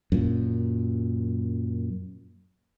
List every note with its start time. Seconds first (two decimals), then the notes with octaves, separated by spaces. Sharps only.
0.12 F#2 A#2